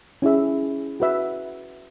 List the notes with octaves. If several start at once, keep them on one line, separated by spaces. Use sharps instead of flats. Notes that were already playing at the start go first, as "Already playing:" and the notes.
C#4 E4 G#4 E5
F#4 B4 E5